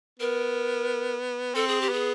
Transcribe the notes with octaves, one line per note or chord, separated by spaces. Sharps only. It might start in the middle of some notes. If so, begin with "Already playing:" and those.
B3 A#4
C4 A4
G#4
G4
B3 G#4